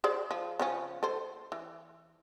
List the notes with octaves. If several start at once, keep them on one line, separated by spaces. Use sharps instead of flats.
G#4 C5 D5
F3
C#3 F3 C#4
A4 C5
E3